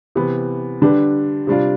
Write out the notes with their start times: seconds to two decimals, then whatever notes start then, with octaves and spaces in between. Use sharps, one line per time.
0.15 C3 E3 B3
0.82 D3 G3 D4 G4 B4
1.47 C3 G3 D4 F4